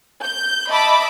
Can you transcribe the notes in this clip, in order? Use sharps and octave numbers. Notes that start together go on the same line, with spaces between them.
G6
D#5 E5 A5 B5 D6